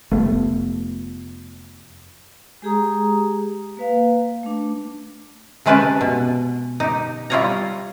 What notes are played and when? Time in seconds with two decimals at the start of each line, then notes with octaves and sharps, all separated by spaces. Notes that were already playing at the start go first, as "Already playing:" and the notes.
0.12 F1 A3 B3
2.62 G#3 G4 G#4 A#5 D#6
3.77 A#3 B4 F5
4.43 A3 D4
5.66 C3 G#3 C#4 B4 G5 A5
6.01 B2
6.80 D#4 G4
7.30 G3 E4 F4 C#5 D#5 A#5